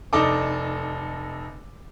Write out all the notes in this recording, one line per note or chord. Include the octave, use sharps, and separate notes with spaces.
F1 D4 D#4 A4 D6